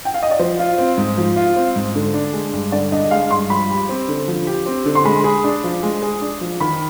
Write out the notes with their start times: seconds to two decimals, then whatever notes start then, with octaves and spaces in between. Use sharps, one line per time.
0.05 G5
0.14 F5
0.23 D#5
0.31 D5
0.39 F3 C5
0.59 F4
0.78 C4
0.97 G#2
1.17 F3
1.36 F4
1.56 C4
1.76 G#2
1.95 D3
2.14 D4
2.33 G#3
2.53 G2
2.72 D3 D5
2.92 D4 D#5
3.04 D#5
3.11 G#3 F5
3.31 G2 C6
3.50 F3 B5
3.69 G4
3.89 C4
4.08 D3
4.28 F3
4.47 G4
4.66 C4
4.85 D3
4.95 C6
5.05 G#3 B5
5.24 G#4
5.44 D4
5.64 F3
5.83 G#3
6.02 G#4
6.21 D4
6.41 F3
6.60 D#3 B5